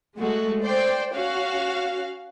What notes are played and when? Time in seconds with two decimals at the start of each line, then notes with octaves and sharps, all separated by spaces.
0.17 G#3 A3 F#4
0.62 C5 D5 G5
1.14 C#4 F#4 F5